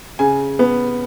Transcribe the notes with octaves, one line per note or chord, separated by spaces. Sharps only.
C#3 G#5
B3